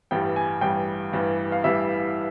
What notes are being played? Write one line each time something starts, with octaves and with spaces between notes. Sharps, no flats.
A1 G2 E3 G3 G5
G#5
A1 G2 E3 G3 G5
A1 G2 E3 G3
F5
A1 G2 E3 G3 E5